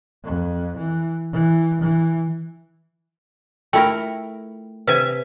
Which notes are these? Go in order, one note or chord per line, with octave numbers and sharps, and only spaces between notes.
F2
E3
E3
E3
A3 E4 F4 A#4 G5
C3 B4 E5 G#5